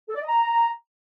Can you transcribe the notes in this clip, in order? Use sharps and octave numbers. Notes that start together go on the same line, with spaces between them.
A4
D5
D#5
A#5